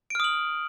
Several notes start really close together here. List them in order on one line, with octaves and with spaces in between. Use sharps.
D7 F6 D#6 F#7